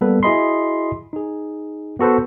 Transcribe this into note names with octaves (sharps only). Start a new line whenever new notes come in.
G3 A#3 B3 A4 B4
E4 F#4 G#4 D#5 B5 C6
D#4 G#4
B3 F#4 A4 B4 C5